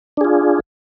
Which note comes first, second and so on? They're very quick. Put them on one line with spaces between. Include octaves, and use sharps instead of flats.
D4 G#4 F4